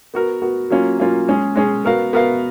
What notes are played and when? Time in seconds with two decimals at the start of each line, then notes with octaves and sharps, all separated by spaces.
0.14 B3 F#4 A#4
0.42 B3 F#4 A#4
0.70 F#3 A#3 C#4 F4
0.99 F#3 A#3 C#4 F4
1.28 G#3 C#4 G#4
1.56 G#3 C#4 G#4
1.85 B3 F#4 A#4 F5
2.13 B3 F#4 A#4 F5